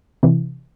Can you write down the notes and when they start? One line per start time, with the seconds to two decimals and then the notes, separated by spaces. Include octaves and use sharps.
0.23 C3 E3